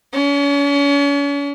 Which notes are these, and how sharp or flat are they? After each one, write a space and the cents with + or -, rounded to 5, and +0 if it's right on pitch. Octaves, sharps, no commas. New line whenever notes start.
C#4 +40